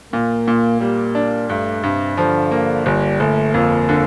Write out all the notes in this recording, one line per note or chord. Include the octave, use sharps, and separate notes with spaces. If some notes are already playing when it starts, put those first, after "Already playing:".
A#2 A#3
A#2
G3 A#3
D4
G2 A3
G2 C3
D3 F3
A#3
G1 G3
G1 A3
F2 A#3
D3